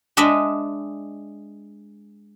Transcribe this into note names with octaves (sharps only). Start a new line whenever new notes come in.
G#3 D4 D#5 E5